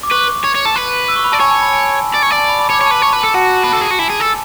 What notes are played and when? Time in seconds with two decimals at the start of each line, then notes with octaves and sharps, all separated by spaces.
0.03 D6
0.11 B4 C#6
0.44 C#5
0.55 C#5
0.65 A4
0.76 B4
1.08 E6
1.16 C#6
1.24 B5
1.32 D5 A5
1.40 C#5 G#5
1.51 A5
1.62 B5
1.73 G#5
2.14 D5
2.22 C#5
2.31 D5
2.38 A5
2.49 B5
2.59 B5
2.70 C#5 D6
2.81 C#5
2.86 B4 A5
3.02 C#5
3.13 B4
3.24 A4
3.34 F#4 A5
3.64 B4
3.73 A4
3.81 G#4
3.91 F#4
3.99 E4 G#5
4.10 G#4
4.20 A4